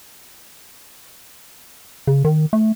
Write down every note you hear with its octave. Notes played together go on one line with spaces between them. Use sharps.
C#3
D#3
A3